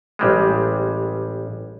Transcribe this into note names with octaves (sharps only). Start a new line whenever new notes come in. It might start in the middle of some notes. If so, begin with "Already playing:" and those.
A1 G3 G#3